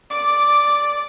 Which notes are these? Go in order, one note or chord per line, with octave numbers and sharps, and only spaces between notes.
D5 D6